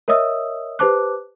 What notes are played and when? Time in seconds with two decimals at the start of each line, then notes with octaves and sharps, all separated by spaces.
0.08 A#4 C#5 D#5 E5 D#6 E6
0.79 G4 B4 C5 A5 D6 F#6